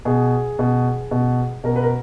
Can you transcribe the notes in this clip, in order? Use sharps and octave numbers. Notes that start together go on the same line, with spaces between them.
B2 G#4
B2
B2
B2 A#4
B4
A#4